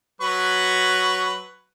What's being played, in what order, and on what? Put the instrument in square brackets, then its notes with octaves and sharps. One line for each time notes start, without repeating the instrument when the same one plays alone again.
[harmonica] F#3 B4 C#6